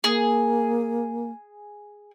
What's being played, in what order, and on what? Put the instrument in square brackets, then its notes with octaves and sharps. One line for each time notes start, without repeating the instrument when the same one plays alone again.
[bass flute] A#3 [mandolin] G#4